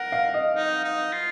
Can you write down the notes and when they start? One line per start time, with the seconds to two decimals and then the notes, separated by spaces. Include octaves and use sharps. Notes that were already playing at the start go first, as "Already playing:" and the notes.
Already playing: A#4 F#5
0.12 F5
0.34 D#5
0.56 D#4
0.84 D#4
1.13 F4